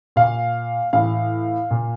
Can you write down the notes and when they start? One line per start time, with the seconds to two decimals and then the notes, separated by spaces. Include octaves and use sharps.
0.16 A#2 F5
0.93 A2 E3 F5
1.71 A#2